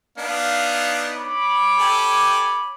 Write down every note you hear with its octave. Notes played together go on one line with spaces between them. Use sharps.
B3 D4 D#4 F5
C#5 B5 D6
G4 A4 G#5